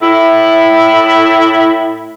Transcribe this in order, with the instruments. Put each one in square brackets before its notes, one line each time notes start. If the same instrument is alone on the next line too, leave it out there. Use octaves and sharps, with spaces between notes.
[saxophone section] A2 E4